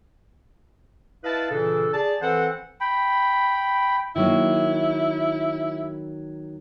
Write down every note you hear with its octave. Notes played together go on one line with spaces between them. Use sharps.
E4 B4 D#5 F5 A5
A#2 C#3 E3 D4 A4
G#4 D5 A5
E3 C4 A4 C5 F#5
G5 B5
D#3 F#3 A#3 E4